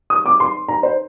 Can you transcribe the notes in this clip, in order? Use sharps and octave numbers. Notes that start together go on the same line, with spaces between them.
D#6
D6
C6
A#5
C5